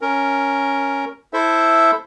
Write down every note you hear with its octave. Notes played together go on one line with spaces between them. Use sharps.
C#4 A#4
E4 A4 C5 E5